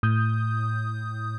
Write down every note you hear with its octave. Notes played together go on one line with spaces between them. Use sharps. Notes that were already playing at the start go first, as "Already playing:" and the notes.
A2 D#6 G6